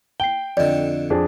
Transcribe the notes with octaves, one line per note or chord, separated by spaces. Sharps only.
G5 C7 G7
F2 D3 D5 D#5
F2 D4 G#4